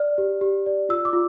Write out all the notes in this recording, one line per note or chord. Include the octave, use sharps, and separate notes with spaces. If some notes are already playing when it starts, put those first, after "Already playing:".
Already playing: D5 F6
G4
G4
D5
F4 E6
D6
F4